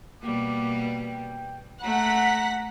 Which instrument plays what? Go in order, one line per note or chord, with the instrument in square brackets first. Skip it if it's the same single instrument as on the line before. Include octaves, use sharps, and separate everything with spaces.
[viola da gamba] B2 G3 A#3 [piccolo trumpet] D6
[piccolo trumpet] G5
[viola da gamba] A3 [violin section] F#5 B6 [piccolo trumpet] A#5